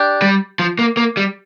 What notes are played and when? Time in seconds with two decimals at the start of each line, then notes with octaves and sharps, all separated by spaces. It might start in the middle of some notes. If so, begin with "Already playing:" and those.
Already playing: D4 G4
0.22 G3
0.59 F3
0.79 A#3
0.97 A#3
1.17 G3